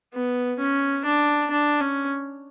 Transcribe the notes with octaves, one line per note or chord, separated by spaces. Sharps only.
B3
C#4
D4
D4
C#4